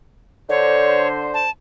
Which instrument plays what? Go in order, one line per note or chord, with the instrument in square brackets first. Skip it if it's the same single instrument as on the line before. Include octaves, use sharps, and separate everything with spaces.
[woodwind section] D3 C5 [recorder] C#5
[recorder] A5